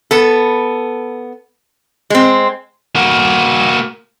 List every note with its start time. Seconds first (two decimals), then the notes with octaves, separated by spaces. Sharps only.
0.11 B3 A4
2.10 G#3 C4
2.96 A#3 F#4